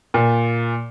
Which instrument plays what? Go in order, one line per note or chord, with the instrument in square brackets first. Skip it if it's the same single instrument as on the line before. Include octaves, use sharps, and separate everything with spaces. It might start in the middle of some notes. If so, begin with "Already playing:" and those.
[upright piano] A#2